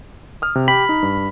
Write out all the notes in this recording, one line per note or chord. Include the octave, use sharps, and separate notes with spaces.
D#6 F6
C3
G4 B5
D#4
G2